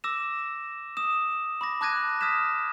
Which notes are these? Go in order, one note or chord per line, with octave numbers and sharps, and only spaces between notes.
D6 E6 A#6 E7
D#6 E7
B5 D6 A#6
A5 D6 F#6 G#6 A#6 D#7
D#6 F6 G#6 B6 E7